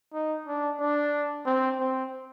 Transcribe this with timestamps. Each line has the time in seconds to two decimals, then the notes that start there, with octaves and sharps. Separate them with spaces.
0.13 D#4
0.46 D4
0.80 D4
1.46 C4
1.80 C4